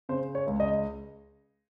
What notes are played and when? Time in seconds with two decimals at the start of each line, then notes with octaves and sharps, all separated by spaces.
0.09 C#3 C5
0.35 C#5
0.47 C#2
0.60 D#5